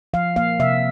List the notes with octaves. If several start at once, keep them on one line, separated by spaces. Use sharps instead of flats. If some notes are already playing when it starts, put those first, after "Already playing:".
F3 F5
A#3 F5
C3 E5